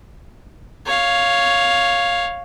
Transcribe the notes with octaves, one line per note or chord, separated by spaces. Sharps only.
C#5 F5